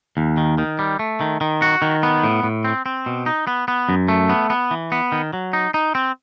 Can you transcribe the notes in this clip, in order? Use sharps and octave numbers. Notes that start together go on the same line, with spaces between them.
D#2
D#3
D#3
G3
A3
D#3
D#3
F#4
D#3
B3
A2
A2
C4
C4
B2
D#4
B3
B3
F#2
A3
B3
B3
E3
B3
D#3
F#3
D#4
D#4
C4